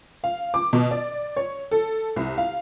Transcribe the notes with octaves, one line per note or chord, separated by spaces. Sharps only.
F5
D6
B2
D5
C#5
A4
C2
F5